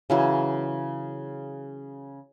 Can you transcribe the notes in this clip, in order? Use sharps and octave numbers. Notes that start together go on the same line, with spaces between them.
C#3 E3 F#3